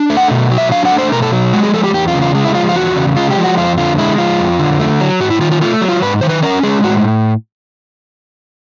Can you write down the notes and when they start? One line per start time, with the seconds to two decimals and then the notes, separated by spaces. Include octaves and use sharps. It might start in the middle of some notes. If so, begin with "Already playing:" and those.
Already playing: D4
0.10 A3
0.17 F#5
0.31 B2
0.51 F#3
0.58 E5
0.71 D4 F5
0.85 F#5
0.92 A3
0.98 C5
1.12 B2 A#4
1.22 A4
1.33 F#3
1.53 G#3 F#4
1.63 G#4
1.73 F3 A4
1.84 G4
1.94 E2 G4
2.08 F4
2.14 C#3
2.21 F4
2.35 G#3
2.45 E4
2.55 F3 F4
2.69 F4
2.75 E2 F#4
2.96 C#3
3.16 G#3 F4
3.31 G4
3.37 F3
3.44 F#4
3.58 F2 F4
3.78 D3 F4
3.98 G#3 E4
4.18 F3 F4
4.39 F2
4.59 D3
4.79 A3
5.00 F#3
5.20 G#2 F#4
5.30 E4
5.41 D#3 F4
5.51 F4
5.61 A3 F4
5.81 F#3
5.88 F4
6.02 G#2 B4
6.21 D#3 C5
6.29 B4
6.42 C#4 A#4
6.63 G#3 G#4
6.84 A2 F#4